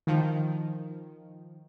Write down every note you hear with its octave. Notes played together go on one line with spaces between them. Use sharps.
D#3 F3